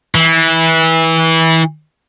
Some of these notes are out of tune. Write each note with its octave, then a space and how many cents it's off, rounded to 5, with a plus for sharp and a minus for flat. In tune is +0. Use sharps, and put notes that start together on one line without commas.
E3 -20